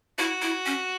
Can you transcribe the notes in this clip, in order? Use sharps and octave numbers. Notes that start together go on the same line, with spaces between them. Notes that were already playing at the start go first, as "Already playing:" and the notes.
E4 F#4
E4
C#4